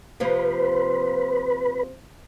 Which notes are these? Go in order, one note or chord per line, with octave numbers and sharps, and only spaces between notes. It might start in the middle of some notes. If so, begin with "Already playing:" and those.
C3 F3 A#3 B4